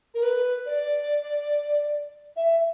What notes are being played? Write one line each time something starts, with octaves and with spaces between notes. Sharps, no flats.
A#4
B4
D5
E5